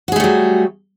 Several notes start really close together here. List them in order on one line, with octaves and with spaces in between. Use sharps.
F#4 G#4 A3 G3 F#3